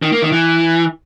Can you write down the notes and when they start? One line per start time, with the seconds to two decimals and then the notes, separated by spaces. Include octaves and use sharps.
0.02 D#3
0.12 A#3
0.22 D#3
0.32 E3